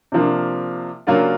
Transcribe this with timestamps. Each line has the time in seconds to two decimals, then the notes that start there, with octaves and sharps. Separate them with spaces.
0.12 C3 F3 A#3 D4
1.07 C#3 F#3 A#3 D4 F4